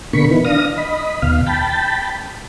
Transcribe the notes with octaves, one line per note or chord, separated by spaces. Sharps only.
B2 D3 A#3 B5 C#6
D#3 E3 B3
D4 F5 D#6 A#6
D#5 B5
D#2 B2 F5
G5 A5 B5